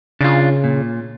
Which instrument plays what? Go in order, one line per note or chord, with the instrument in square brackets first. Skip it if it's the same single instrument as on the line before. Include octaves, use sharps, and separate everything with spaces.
[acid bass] C#3 [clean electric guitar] D4 F4
[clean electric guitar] A#2